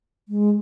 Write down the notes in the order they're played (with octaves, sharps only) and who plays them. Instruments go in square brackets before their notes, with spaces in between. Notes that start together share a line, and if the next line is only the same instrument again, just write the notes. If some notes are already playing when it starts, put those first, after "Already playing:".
[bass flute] G#3